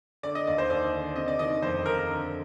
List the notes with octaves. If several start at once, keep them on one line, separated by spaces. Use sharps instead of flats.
D3 D5
D#5
D#2 D5
C5
D#2 D5
D3
C3 D#5
D5
D#3 D#5
F2 C5
F2 A#4
D3